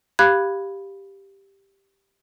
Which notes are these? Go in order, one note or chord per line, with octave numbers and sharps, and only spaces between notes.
G4 F5 B5 F#6 G#6